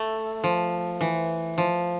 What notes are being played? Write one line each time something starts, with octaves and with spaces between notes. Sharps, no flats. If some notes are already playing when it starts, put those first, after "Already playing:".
Already playing: A3
F3
E3
F3